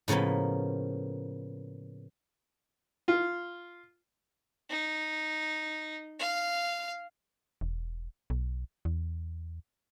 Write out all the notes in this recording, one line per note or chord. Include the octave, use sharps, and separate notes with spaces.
A2 C#3 F3 A#3 B3
F4
D#4
F5
E1
B1
E2